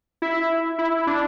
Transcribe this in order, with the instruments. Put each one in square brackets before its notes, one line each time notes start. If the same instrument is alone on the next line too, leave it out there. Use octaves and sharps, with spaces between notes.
[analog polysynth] E4 E5
E4
D4